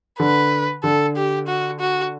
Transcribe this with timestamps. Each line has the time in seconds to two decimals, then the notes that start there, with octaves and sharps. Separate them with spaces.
0.20 D3 B4
0.84 D3 A4
1.16 G4
1.48 F#4
1.80 F#4